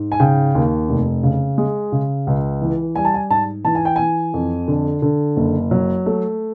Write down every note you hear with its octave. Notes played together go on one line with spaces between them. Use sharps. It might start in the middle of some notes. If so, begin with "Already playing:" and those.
Already playing: G#2
G#5
C#3 G5
D#2
F1
C#3
G#3
C#3
C#2
E3
G3 G#5
A5
G#5
G#2 A5
E3 A5
G#5
G5
E3 G#5
F2
D3
D3
F#1
F#3
A3